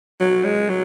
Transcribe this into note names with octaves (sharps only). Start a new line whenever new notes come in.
F#3
G#3
F#3